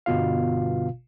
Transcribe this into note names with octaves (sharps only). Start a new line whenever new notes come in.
G1 B2 F4 F5